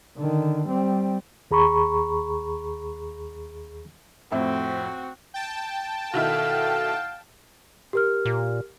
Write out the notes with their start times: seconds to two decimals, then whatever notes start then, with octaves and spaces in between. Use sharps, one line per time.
0.17 D3 D#3
0.68 G3 C4
1.51 D#2 G#4 A#5 B5 C#6
4.32 F2 A2 C4 F#4 E5
5.34 G5 A5
6.13 B2 D#3 E4 A4 F5
7.93 G4 A#4 F6
8.25 A#2